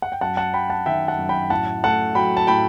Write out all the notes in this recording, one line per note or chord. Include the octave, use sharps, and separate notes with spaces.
F#5
G5
F#2 F#5 A5
F#5 A5
F#3 G5 B5
F#5 A5
D#3 E5 G5
F#5 A5
F#2
G5 B5
A2 F#5 A5
A3 F#5 A5
F#3 G5 B5
A5
A2 G5 B5